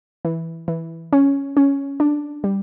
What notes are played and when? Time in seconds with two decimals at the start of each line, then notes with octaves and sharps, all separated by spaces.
0.25 E3
0.68 E3
1.13 C#4
1.57 C#4
2.00 D4
2.44 G3